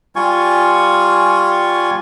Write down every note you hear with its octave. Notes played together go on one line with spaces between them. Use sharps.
G3 F4 G#5 C#6